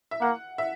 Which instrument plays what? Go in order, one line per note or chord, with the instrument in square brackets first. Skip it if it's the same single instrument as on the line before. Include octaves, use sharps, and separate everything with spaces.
[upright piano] E5
[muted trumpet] A#3 [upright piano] F#5
[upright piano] E5